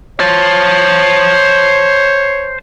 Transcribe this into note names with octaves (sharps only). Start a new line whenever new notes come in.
C5 C#5 A5